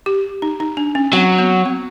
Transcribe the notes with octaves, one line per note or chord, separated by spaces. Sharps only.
G4
D#4
D#4
D4
C#4
F#3 C4
B3
C4